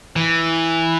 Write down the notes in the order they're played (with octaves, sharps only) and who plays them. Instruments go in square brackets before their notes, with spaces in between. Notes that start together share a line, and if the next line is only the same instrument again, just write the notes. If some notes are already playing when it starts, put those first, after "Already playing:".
[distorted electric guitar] E3